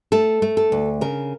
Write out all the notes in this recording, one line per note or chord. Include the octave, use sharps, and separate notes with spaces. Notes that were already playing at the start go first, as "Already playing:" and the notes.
A3 A4
A3
A4
D2
C#3 A#4